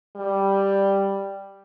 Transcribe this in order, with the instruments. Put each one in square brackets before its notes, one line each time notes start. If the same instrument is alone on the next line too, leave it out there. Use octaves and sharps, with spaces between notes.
[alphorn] G3